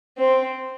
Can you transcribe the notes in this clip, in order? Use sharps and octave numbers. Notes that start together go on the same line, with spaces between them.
C4